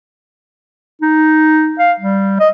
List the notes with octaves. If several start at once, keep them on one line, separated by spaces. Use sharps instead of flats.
D#4
F5
G3
D#5